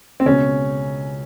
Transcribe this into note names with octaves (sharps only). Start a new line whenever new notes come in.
C4
C#2 B2 C#4